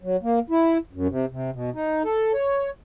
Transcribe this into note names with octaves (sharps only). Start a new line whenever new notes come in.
F#3
A#3
E4
F#2
C3
C3
B2
D#4
A4
C#5